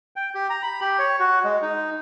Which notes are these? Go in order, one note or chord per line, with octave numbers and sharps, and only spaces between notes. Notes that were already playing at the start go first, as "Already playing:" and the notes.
G5
G4
A#5
B5
G4
C#5
F#4
G#3
D#4